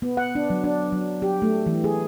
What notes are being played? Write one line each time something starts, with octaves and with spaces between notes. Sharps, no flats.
B3
F#5
D4
F#3
D4
F#3
G4
A3
E3
G#4